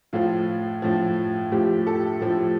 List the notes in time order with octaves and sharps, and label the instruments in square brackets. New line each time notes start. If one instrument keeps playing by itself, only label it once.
[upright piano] A2 F3 F4
A2 F3
A2 F3 G4
A4
A2 F3